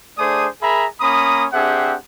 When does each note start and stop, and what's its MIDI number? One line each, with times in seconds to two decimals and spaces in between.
0.18 0.47 57
0.18 0.47 62
0.18 0.47 68
0.18 0.47 72
0.18 0.47 74
0.18 0.47 87
0.61 0.85 68
0.61 0.85 70
0.61 0.85 76
0.61 0.85 82
0.61 0.85 83
1.00 1.46 58
1.00 1.46 61
1.00 1.46 82
1.00 1.46 83
1.00 1.46 87
1.53 1.95 60
1.53 1.95 62
1.53 1.95 67
1.53 1.95 68
1.53 1.95 76
1.53 1.95 78